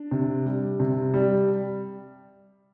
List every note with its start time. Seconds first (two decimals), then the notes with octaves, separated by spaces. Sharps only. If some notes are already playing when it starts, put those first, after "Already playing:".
Already playing: D4
0.11 C3
0.46 G3
0.80 C3
1.14 G3